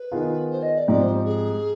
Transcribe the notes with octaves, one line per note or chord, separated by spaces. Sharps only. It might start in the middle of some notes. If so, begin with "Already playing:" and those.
Already playing: B4
D#3 B3 F4 G#4
C5
D#5
D5
G#2 F3 C4 G4 D5
C5
G#4